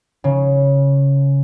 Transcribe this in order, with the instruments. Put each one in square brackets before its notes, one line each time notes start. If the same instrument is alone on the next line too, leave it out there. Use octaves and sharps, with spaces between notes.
[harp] C#3